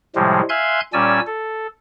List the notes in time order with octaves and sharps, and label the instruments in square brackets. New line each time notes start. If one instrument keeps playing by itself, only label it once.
[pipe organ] A2 C3 F3 G3 G#3
E5 F5 G#5 C6 F#6 G#6
A#2 G3 C#4 D5 G#5 E6
A4